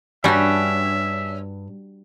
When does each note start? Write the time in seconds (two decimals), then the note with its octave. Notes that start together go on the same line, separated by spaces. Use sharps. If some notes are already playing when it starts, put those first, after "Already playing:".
0.24 G2 G3 C#4 D4 F#4 E5